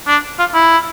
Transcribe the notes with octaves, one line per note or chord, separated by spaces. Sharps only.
D4
F4
E4